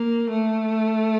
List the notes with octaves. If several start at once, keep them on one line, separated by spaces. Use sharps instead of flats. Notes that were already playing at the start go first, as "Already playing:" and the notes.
Already playing: A#3
A3